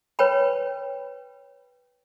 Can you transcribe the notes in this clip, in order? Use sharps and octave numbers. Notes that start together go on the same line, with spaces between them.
B4 C#5 G5 B5